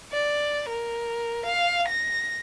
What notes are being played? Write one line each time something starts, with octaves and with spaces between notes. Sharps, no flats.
D5
A#4
F5
A#6